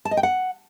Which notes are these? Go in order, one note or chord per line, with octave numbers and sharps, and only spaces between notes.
A5
D#5
G5
F#5